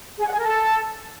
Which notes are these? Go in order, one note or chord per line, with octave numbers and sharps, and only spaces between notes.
G#4
F#5
G#4
A#4
A4